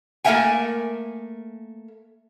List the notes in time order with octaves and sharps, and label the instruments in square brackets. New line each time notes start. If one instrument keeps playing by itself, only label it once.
[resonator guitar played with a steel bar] A3 A#3 A#4 E5 G5 G#5